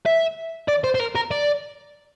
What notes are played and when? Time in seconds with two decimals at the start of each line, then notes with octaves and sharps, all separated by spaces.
0.06 E5
0.68 D5
0.84 C5
0.95 C5
1.00 A#4
1.16 A#4
1.31 D5